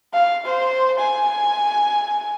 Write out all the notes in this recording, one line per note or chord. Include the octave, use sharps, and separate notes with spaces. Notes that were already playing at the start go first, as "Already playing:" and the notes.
F5
C5
G#5